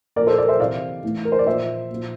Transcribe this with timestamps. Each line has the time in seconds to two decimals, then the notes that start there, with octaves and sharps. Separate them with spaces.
0.16 A#2 F3 A#4 D5
0.27 A4 C5
0.38 A#4 D5
0.48 C5 E5
0.60 C3 E3 D5 F5
1.03 A2 E3
1.25 A#4
1.32 C5
1.39 D5
1.46 A#2 F3 C5 E5
1.90 A#2 F3